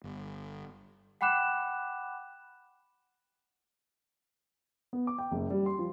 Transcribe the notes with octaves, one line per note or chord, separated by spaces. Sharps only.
G1
F#5 G5 B5 D6 F#6 E7
B3
D6
G5
F#1
G3
C6
F3